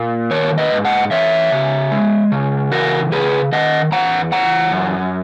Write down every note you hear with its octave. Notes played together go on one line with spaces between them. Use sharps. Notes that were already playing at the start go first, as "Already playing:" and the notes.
Already playing: A#2 A#3
D#3 A#4 C#5
B4 D#5
G#2
D#5 F#5
E3 C#5 E5
C#3
G#3
C#3
E3 F#4 A#4
C#3 G#4 B4
D#3 D#5 F#5
E2 F#5 A#5
E3 F#5 A#5
F#2